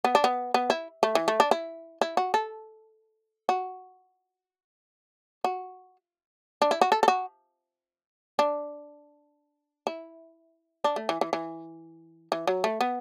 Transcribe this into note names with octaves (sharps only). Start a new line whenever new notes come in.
B3
D4
B3
B3
E4
A3
E3
A3
D4
E4
E4
F#4
A4
F#4
F#4
D4
E4
F#4
A4
A4
F#4
D4
E4
D4
A3
E3
E3
E3
E3
F#3
A3
B3